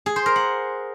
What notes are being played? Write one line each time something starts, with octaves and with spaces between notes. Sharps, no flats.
G#4
C5
A#4
F#5